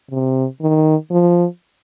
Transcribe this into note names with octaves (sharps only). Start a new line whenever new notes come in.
C3
D#3
F3